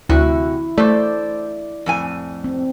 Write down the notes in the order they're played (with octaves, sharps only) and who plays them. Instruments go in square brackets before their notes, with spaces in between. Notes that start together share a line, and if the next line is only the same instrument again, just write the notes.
[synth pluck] D2 [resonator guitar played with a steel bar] C3 F#4 [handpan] E4
[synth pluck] A3 [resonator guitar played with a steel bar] A4 C5 [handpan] D5
[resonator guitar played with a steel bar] F2 A2 G#5
[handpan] C4